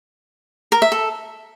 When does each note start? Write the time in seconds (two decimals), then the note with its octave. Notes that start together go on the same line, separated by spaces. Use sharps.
0.72 A#4
0.82 E5
0.92 A4